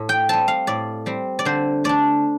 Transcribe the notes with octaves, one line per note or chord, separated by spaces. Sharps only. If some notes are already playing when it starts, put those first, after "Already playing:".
Already playing: A2
G5
G3 C4 A5
F5
A2 D5
G3 C4
D5
D3 C5
A3 D4 D5